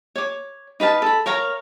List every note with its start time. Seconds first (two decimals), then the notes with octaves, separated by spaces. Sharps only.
0.16 C#5 D6
0.80 D#4 B4 F5 A5
1.02 A4 B5
1.26 A#4 C#5 F5 A#5